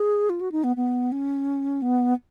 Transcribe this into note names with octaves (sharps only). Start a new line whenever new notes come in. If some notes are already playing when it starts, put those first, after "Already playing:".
Already playing: G#4
F4
F#4
D#4
B3
B3
C#4
B3